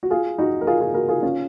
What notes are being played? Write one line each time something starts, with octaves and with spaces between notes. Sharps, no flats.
F#4
F4 G#4
D#4 F#4
A#4
F4 G#4
F4 G#4
F#4 A#4
F4 G#4
C#4 F4